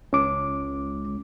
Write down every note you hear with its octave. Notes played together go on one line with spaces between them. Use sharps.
C#2 C#4 D6